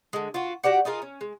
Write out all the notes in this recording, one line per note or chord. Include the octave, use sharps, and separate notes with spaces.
D3 G#3
F4 F#4
F#4 G4 D5 F#5
D#4 F4 G#4 A#4
C#4
G#3